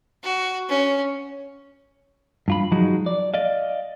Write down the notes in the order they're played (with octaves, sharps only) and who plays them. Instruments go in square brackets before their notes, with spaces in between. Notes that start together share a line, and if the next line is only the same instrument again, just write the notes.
[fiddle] F#4
C#4
[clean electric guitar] G2 F4 B5
F3 F#3 G#3 D#4 F#4
D5
D5 D#5 F5